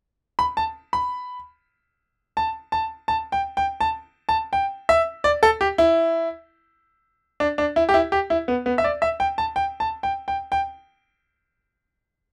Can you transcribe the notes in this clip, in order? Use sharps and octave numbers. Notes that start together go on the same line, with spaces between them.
B5
A5
B5
A5
A5
A5
G5
G5
A5
A5
G5
E5
D5
A4
G4
E4
D4
D4
E4
G4
E4
G4
E4
B3
B3
E5
D5
E5
G5
A5
G5
A5
G5
G5
G5